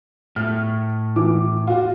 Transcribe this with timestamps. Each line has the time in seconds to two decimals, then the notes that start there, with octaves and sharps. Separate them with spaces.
0.36 A2 F6
1.16 E3 D6
1.67 F4 F#4